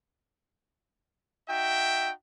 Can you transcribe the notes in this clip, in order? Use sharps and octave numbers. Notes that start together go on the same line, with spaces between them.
D#4 F#4 E5 G5